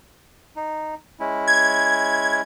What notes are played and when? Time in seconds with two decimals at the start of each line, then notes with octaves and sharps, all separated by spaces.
0.56 D#4
1.20 G#3 C#4 E4
1.47 G#6